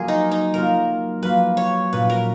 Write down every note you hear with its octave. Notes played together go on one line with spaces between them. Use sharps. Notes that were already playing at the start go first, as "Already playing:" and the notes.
Already playing: F#3 A#3 F4 G#4 A#4
D#4
D#4
F#3 A#3 F4 A#4
F#3 A#3 F4 B4
C#5
A#2 F#3 C#4 B4
A#4